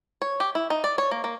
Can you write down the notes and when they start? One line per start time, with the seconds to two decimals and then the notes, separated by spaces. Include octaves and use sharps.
0.22 C#5
0.40 G4
0.55 E4
0.70 D#4
0.84 D5
0.98 C#5
1.11 A#3
1.24 A#3